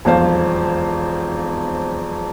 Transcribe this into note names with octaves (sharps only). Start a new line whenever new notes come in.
E1 B1 F2 C5 F5